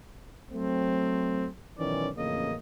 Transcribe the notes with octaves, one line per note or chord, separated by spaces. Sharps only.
F#3 A3 C4
B1 D#3 E3 C#4 D5
A1 F2 C#3 A#3 D#5